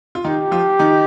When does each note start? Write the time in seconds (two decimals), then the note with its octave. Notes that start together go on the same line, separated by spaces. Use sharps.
0.15 F4
0.25 D#3 D#4 G4
0.51 F3 F4
0.79 D#3 D#4